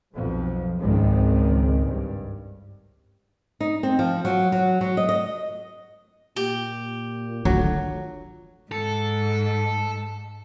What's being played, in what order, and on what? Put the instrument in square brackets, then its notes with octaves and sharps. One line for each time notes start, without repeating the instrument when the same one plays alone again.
[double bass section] B1 F2 B2 F3
G#1 C#2 D#3 C4
G2
[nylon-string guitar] D#4
C4
F3
F#3
F#3
F#3
D#5
D#5
[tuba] A#2 [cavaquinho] G4
[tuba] D3 [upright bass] D#3 F4 [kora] F#3
[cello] G#2 [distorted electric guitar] A4